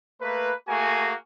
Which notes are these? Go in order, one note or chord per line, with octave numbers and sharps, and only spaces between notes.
A3 A#3 B4
A3 A#3 F#4 G#4 G#5